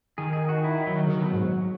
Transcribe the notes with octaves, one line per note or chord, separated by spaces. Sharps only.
D#3 G#4
G#4
F#4
E4
F#3
C#3
D#3
B2
G#2